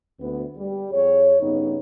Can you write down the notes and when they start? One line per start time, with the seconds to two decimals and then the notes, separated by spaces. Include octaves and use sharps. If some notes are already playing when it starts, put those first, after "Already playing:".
0.20 D2 B3
0.57 G3
0.92 F2 G#4 C#5
1.40 G2 C#3 B3 D#4